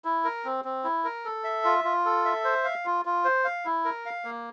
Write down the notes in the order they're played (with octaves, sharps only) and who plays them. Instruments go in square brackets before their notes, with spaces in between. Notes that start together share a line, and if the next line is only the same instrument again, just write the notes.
[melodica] E4
A#4
C4
C4
E4
A#4
A4
E5
F4
F4
A4
E5
C5
F5
F4
F4
C5
F5
E4
A#4
F5
A#3